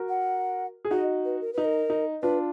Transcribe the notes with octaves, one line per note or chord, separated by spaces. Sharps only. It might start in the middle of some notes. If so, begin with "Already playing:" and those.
Already playing: F#4 A#4
F#5
G#4
D#4 F#4 D#5
B4
A#4
D#4 B4
A#4
D#4
D4 F4 B4